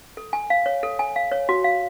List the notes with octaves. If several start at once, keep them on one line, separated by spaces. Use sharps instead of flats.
A4
G#5
F5
C#5
A4
G#5
F5
C#5
F#4
F5